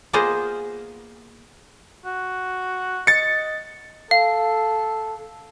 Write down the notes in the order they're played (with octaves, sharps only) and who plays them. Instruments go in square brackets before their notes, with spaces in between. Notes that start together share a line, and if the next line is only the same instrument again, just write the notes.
[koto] A#3 B3 F4 G#4 C5 D#5
[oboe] F#4
[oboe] D#5 [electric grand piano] A6 C#7
[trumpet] A4 [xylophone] F5